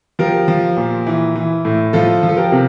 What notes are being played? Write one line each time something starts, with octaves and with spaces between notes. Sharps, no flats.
F3 G4 A#4
F3
A#2
E3
E3
A2
F3 F4 A4
F3
A4
G4 A#4
C3